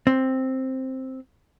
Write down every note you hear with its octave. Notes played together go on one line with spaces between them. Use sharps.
C4